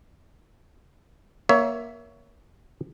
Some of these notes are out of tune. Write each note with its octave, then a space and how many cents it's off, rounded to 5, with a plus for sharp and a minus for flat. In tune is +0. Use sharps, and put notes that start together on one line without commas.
A#3 +20 C#5 +20 E5 +0